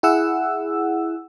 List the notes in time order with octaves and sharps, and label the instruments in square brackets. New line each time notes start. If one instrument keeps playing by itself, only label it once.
[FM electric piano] E4 G#4 F#5 E6